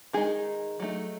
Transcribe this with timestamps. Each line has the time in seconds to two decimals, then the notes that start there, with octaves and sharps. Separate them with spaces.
0.13 D#3 G#3 D#4 G#4
0.80 F#3 A3 D#4